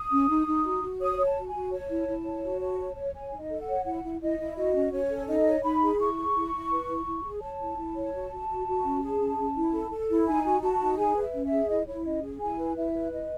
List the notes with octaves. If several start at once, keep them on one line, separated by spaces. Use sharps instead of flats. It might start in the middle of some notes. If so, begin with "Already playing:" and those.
Already playing: D#6
C#4
D#4
D#4
F#4
F#4
C#5 D#6
C#5
A5
F#4
G#5
F#4
C#5 A5
E4
E4
C#5
F#4
C#5
C#5
C#5
C#5 G#5
D#4
D#5
A4
F#5
C#5
E4 F#5
E4
E4 D#5
E4
F#4 D#5
C#4
C#4 C#5
A4
D#4 D#5
C#5
D#4 B5
G#4
E4 C#6
G#4
E4
E4
B4
E4
E4
G#4
C#5 A5
E4
E4
C#5
F#4
F#4
F#4
F#4
C#4
G#4
C#4
C#4
E4
A4
A4
E4
D#4 G#5
F#4
F#4 A5
D#4
G#4 G#5
B4
E5
C#4
E5
G#4
E4 D#5
E4 C#5
C#4 D#5
G#4
E4 G#5
B4
E4 E5
B4
E4 D#5